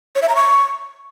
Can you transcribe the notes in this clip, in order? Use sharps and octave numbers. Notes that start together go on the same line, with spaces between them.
C#5
E5
A#5
C#6